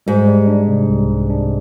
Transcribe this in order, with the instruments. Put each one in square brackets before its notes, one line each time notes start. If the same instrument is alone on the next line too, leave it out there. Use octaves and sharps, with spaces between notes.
[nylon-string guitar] G#2 [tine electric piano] G3
[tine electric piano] G3
D4
C3
C2
C3
D4